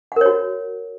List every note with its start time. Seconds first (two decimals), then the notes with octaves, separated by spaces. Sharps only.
0.12 F#5
0.16 A#4
0.21 C#5
0.26 F#4